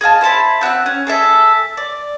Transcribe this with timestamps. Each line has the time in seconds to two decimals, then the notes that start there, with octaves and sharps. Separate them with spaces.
0.01 G#4 D#5 F5 A5
0.21 E4 C5 A5 B5
0.61 C4 F#4 E6 F#6
0.86 C#4
1.07 G#4 A4 E5
1.77 D5